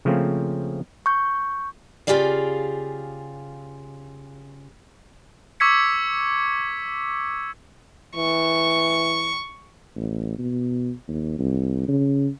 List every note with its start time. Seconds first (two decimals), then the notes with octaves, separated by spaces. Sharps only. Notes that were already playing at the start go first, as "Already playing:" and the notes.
0.05 C#3 F3 A3 A#3 C4 C#4
1.06 C#6 G6
2.07 C#3 F4 G4 G#4 D5 F5
5.60 C#6 D6 E6 G#6 B6 C#7
8.16 E3 C#6
9.96 A1
10.38 B2
11.08 D#2
11.39 C2
11.88 C#3